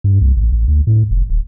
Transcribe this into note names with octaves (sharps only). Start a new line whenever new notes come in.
G2
C2
A1
A1
D2
A2
F1
D1